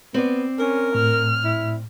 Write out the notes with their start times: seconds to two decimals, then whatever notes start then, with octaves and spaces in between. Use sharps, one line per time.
0.14 B3 C4 D5
0.59 C#4 A#4
0.95 A2 F6
1.44 E4